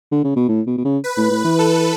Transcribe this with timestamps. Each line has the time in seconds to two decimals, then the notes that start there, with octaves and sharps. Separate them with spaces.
0.12 D3
0.24 C#3
0.36 B2
0.49 A2
0.67 B2
0.78 B2
0.85 C#3
1.04 B4
1.17 A2
1.31 A2
1.45 E3
1.59 A4